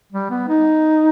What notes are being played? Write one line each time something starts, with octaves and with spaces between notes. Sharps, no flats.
G3
B3
D#4